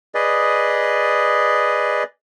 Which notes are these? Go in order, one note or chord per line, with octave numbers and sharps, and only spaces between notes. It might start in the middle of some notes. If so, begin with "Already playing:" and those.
G#4 B4 D5 D#5